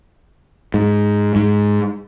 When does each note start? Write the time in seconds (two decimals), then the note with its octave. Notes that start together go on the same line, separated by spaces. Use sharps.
0.74 G#2
1.36 G#2